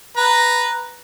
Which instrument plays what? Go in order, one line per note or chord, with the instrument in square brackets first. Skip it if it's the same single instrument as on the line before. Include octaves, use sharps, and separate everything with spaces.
[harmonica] B4 A#5